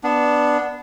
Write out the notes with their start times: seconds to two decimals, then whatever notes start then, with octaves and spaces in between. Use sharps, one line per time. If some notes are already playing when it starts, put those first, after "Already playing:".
0.03 B3 D4